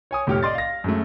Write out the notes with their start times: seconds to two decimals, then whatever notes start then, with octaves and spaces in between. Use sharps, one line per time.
0.11 C#5 G#5 D#6
0.27 F1 A2 G4 C#5 F6
0.43 D5 D#5 C6 A6
0.55 F5 A#6
0.84 F#2 G#3 A3